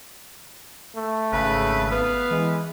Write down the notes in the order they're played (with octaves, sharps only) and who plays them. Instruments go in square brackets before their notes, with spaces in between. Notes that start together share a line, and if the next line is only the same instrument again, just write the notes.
[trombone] A3
[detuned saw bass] G#1 [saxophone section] C#3 [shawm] B4
[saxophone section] B3 B4 [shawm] F5
[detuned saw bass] E3 [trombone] G#3